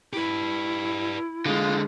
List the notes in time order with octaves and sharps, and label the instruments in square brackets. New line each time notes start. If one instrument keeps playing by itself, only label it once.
[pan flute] E4 [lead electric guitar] G4 B4
[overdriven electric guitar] D3 G#3 [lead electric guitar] F4